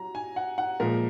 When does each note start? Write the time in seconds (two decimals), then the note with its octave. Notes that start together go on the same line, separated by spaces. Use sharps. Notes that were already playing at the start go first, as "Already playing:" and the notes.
Already playing: F#3 A#5
0.15 G#5
0.36 F#5
0.58 F#5
0.80 A#2 F3 G#3 A#4